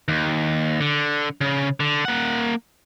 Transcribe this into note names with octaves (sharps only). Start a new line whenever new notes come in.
D#2
D3
C#3
D3
A#3 F#5